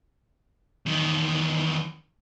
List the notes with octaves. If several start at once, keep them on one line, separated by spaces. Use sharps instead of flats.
E2 D#3